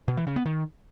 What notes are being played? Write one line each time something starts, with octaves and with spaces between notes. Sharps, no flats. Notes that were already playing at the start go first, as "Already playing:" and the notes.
B2
E3
C#3
B3
D#3